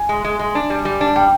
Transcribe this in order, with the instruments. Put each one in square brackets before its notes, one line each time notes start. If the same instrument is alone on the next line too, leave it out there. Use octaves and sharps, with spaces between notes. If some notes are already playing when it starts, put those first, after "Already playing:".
Already playing: [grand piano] G#5
[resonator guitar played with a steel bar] G#3
G#3
G#3
D4
G3
G3
D4
[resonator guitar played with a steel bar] G3 [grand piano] G5